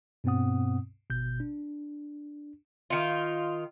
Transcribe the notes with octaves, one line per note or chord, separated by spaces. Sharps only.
G2 B2 B3 C4 F#5 D#6
G#1 B2 G6
D4
D#3 F4